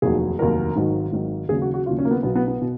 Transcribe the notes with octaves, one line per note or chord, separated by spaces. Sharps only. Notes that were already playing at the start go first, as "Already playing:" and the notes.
F1 D#2 D#3 F#3 G#4
F1 D#2 D#3 F#3 A#4
G#1 G#2 D#3 F#3
G#1 G#2 D#3 F#3
D#2 C#3 F#3 G#4
F#4
F#4
D#2 C#3 F#3 F4
C#4
A#3
B3
B1 B2 F#3 B3
B3
B3
B2